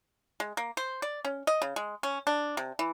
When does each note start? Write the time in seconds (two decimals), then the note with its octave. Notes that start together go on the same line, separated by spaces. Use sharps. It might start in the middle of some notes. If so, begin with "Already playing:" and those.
0.40 G#3
0.57 A#3
0.77 C5
1.02 D5
1.25 C#4
1.47 D#5
1.62 C#3
1.76 G#3
2.03 C#4
2.27 D4
2.57 C3
2.79 E3